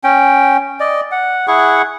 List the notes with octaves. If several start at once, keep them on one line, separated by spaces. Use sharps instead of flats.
C#4 G5
D5 D#5
F#5
E4 G#4 F#5 C#6